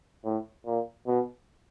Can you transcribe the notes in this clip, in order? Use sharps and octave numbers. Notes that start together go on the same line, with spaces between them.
A2
A#2
B2